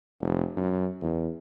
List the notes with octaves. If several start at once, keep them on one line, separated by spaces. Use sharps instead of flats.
F1
F#2
E2